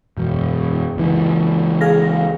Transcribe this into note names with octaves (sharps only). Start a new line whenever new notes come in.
E1 F#2
C#2 E3
G#4 F5 A#6